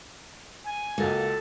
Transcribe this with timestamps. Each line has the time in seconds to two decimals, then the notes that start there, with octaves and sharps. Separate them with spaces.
0.66 G#5
0.98 C#2 A#3 F#4 A4